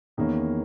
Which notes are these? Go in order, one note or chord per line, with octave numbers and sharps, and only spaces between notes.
E2 D#3 A#3 C#4